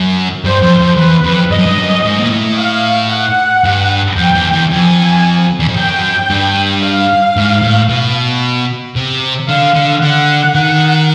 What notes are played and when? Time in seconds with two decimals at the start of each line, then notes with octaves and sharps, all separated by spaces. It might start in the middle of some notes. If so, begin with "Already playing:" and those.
Already playing: F#2
0.45 G2 C5
0.63 F2
0.80 F2
0.97 E2 B4
1.24 F2
1.51 G2 D#5
1.58 F#2
1.66 G2
1.78 F#2
2.04 G#2
2.19 A#2
2.31 A2
2.58 F5
3.11 F#5
3.64 G2
4.16 F2 G5
4.35 E2
4.52 E2
4.70 F2 G#5
5.60 E2
5.68 F2
5.77 F#2 G5
6.30 G2
6.83 F5
7.36 G#2
7.62 A2
7.89 B2
8.96 C3
9.49 D3 F5
9.75 D3
10.02 D3 F#5
10.55 D#3